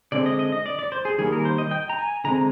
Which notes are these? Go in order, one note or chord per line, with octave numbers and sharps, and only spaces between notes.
D3 G#3 C4 D5
D#5
D#5
D#5
D5
D5
C5
G#4
D#3 G3 A#3 G#4
A#4
C5
D#5
G5
A#5
G#5
D3 G#3 C4 A#5